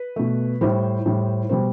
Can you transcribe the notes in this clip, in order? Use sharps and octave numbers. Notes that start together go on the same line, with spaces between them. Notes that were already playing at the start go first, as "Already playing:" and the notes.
Already playing: B4
B2 A3
A2 G3 C5
A2 G3
B2 G3 C5